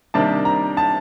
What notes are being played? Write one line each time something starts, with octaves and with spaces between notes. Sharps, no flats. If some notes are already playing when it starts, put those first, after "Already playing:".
C3 D#3 G3 A#3 D4 A5
A#5
A5